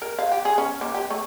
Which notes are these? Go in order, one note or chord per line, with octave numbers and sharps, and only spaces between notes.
A#4
F5
G4
G#4
C#4
A#3
G4
A3